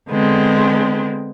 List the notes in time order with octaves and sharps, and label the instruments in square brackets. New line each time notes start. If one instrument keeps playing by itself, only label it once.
[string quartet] D3 G#3 B3 C4